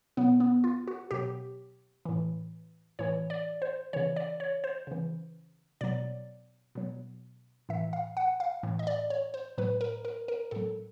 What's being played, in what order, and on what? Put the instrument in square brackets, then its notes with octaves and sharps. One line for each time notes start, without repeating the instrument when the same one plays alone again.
[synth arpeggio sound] B2 F#3 B3
B3
F4
F#4
B2 F#3 G4
A2 E3
A2 E3 C#5
D5
C5
C#3 E3 C#5
D5
C#5
C5
C#3 E3
B2 F#3 D5
B2 F#3
A2 E3 E5
F5
F#5
F5
A2 E3
D#5
D5
C#5
C5
A2 F#3 B4
A#4
A#4
A#4
A2 F#3 A4